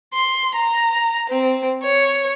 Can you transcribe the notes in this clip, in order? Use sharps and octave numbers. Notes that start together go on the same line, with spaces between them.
C6
A#5
C4
C#5